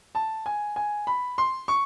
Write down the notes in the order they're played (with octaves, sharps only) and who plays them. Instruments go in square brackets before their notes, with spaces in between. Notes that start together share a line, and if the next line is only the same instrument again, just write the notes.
[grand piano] A5
G#5
G#5
B5
C6
C#6